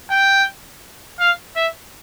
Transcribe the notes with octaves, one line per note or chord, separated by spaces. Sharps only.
G5
F5
E5